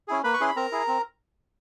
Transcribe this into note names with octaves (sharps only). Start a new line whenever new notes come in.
C#4 E4 G#4
A#3 B4 B5
C#6
C#4 E4 G#4 C6
B5
C4 A#4 A#5
E4 G#4
C4